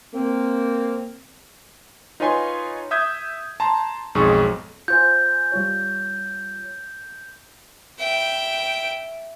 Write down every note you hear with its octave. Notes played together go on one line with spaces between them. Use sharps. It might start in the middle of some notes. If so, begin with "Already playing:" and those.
A#3 C4
D#4 F4 B4 C#5 G#5 C6
E5 D#6 G6 G#6
A5 A#5 C6
B1 F2 G#2 G#4 C#6
F4 C5 G#5 G6
G3 F4 C#5
E5 G5